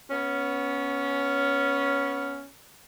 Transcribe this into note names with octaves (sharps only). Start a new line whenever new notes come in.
B3 C#4